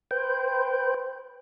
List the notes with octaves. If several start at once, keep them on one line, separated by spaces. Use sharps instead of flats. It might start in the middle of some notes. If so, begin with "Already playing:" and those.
B4 C5 G5